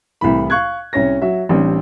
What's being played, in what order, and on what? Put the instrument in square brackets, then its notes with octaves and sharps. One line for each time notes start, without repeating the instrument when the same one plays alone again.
[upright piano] C2 A2 E3 B5
F5 C#6 F#6 G#6
C2 C#4 C#5 A#6
F#3 F#4 E5
A1 G3 C4 D4